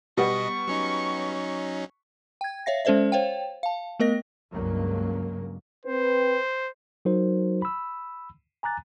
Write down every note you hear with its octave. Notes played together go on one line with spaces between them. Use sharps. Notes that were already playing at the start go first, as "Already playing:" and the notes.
B2 G3 B3 D#5 C#6
F#3 C#4 D#4
G5 G#6
C#5 E5 F5 A#6
G#3 C#4 A4 C5 D5 E5
C5 C#5 F5 G5
F5 A5
A3 B3 A#4 D#5 A#6
C#2 G2 C#3 F#3 A#3
C4 B4 C5
F#3 D#4 F#4 A#4 C5
B5 E6
G#5 A#5 D6 F#6 A6